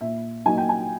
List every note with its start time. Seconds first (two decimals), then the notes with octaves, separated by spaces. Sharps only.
0.01 A#2 E5
0.46 F#3 A#3 D#4 G#5
0.58 G5
0.69 G#5